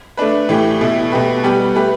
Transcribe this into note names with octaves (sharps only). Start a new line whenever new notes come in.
A3 D4 B4
A2 E3 A3 G4
B2 A3 E4
B2 A3 G4 B4
G3 B3 G4 B4
A3 G4 B4